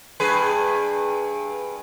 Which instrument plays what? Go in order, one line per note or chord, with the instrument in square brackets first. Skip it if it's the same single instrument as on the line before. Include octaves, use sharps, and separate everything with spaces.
[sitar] G2 G#4 B4